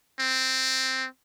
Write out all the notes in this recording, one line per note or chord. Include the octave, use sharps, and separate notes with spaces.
C4